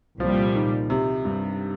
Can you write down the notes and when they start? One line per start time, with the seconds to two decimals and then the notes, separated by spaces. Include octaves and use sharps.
0.20 C2 A#2 F3 G3
0.55 D#3
0.90 C3
1.25 G2